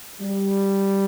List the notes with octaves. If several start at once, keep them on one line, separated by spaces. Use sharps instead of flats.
G3